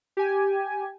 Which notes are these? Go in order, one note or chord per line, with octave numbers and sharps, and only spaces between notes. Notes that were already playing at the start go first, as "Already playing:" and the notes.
G4 G#5